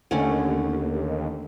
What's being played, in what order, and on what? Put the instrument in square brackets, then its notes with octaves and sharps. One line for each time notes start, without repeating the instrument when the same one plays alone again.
[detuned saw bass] D#2 [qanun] D3 A3 C#4